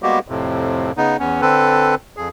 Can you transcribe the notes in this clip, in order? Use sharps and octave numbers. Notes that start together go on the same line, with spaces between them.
G3 G#3 A#3 B3 F#4 G4
F2 A2 C3
C#3 B3 D#4
E2 B3 C#4
D3 C4 A4 B4
F2 G#4